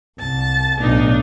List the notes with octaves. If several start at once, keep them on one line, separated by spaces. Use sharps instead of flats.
C2 A5
B1 A2 D4 D#4